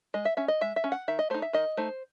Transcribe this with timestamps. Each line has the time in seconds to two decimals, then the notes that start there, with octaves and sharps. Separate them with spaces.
0.14 G#3 D#5
0.25 E5
0.37 C#4 E5
0.48 D#5
0.61 G#3 E5
0.76 E5
0.84 C#4
0.92 F#5
1.08 D#3 E5
1.19 D#5
1.30 A3 D#4 C5
1.42 E5
1.53 D#3 D#5
1.77 A3 D#4 C5